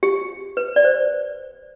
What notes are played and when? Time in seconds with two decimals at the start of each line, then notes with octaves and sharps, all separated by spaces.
0.03 G4
0.57 B4
0.76 D5
0.84 C5